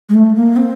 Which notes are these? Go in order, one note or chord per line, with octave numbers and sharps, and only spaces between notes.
G#3
A3
A#3
C4